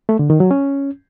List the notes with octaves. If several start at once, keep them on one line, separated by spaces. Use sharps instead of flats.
A3
D3
D#3
F#3
C#4